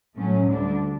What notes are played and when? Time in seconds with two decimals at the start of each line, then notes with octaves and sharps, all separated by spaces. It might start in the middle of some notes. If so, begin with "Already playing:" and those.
0.16 A2 F#3 A3 C#4
0.48 D2 D3 G3 D4